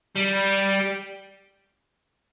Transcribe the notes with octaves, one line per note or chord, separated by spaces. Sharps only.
G3